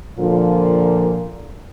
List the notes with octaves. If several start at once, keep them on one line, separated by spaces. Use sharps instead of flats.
A#2 D3 F3